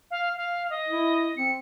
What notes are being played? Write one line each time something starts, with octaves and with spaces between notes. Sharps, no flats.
F5
F5
D#5
E4
C4 C#7